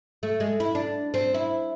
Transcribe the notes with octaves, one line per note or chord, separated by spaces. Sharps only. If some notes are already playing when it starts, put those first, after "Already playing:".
A3
G#3
E4
D4
C4
E4